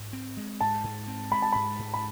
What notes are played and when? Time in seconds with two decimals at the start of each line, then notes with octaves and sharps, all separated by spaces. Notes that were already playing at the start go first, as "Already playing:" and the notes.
Already playing: G#2
0.13 C4
0.37 G#3
0.61 G#2 A5
0.84 G#2
1.07 C4
1.32 G#3 B5
1.42 A5
1.52 G#2 B5
1.79 G#2
1.94 B5